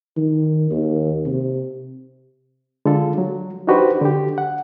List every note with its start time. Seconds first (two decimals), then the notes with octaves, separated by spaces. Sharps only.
0.17 D#3
0.71 D#2
1.25 C3
2.85 D3 G#3 F4 A4
3.18 F#3
3.67 D4 D#4 F#4 G4 B4 C5
4.01 D3 G4
4.38 F#5